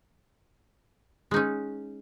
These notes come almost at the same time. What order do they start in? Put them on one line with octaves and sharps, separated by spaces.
G#3 D#4 C#4